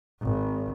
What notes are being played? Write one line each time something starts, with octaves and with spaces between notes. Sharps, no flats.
G#1